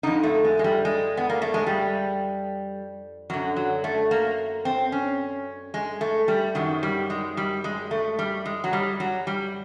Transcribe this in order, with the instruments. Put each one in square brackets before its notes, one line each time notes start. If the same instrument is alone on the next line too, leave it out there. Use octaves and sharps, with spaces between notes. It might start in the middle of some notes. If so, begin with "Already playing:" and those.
[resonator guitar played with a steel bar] F2 D3 D#4
A3
G#3
G#3
G3
G#3
B3
A#3
A3
G#3
G3
F#2 D3 F#3
F#3
A3
A#3
C4
C#4
G#3
A3
G3
F#2 D#3 F#3
G3
G#3
G3
G#3
A3
G3
G#3
F#3
G3
F#3
G3